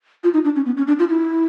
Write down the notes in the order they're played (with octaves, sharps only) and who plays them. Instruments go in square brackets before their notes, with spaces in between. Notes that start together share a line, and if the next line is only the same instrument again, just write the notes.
[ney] F4
D#4
D4
C#4
B3
C#4
D4
F4
E4